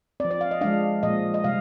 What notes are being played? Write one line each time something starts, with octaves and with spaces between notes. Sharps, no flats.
F3 C4 D5
D5
F5
D#5
F3 G#3 D4 F5
A#2 F3 G#3 D#5
D#5
C3 G3 F5